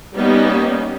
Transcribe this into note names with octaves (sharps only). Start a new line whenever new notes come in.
G3 A#3 B3 C#4 D#4